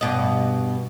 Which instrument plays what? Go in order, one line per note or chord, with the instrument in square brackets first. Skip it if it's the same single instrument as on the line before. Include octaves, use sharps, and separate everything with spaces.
[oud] G2 B2 D#5